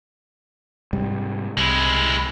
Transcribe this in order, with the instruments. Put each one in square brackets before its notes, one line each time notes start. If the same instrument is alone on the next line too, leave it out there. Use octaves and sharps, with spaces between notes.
[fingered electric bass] G#2 C3 G3
[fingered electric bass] C2 [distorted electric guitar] G#3 E4